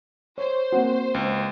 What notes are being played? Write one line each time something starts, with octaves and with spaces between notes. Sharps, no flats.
C5 C#5
A#3 C4 F#4
C#2